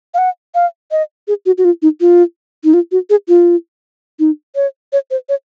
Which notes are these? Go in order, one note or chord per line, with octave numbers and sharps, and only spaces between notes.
F5
F#5
F5
D#5
G#4
F#4
F#4
F4
D#4
F4
D#4
F4
F#4
G#4
F4
D#4
C#5
C#5
C5
C#5